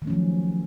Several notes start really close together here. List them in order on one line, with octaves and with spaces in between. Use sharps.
D#3 A3 C#4 F3 F#3